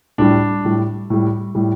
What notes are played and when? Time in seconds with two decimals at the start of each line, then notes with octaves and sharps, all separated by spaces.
0.18 A2 G3 D4
0.65 A2 G3
1.10 A2 G3
1.55 A2 G3